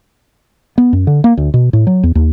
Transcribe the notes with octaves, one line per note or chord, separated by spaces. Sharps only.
B3
F#2
D3
A#3
D2
B2
A2
F#3
E2
D#2